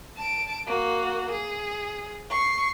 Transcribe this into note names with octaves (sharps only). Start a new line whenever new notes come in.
A5 D7
A#3 F#4
G#4
C#6 C7